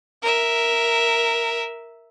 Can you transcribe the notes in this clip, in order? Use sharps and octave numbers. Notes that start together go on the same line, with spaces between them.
A#4 E5